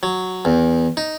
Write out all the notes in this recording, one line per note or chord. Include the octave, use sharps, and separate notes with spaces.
F#3
E2
D#4